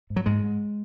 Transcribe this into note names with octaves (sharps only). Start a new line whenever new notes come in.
G#2
F#3
G#2 G#3
G#2